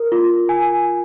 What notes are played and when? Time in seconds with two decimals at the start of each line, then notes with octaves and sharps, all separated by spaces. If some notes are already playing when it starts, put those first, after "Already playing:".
Already playing: A#4
0.12 F4
0.49 G#5